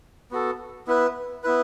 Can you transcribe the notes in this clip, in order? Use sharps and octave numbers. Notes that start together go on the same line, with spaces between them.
B3 F#4 A4
B3 E4 B4
B3 E4 B4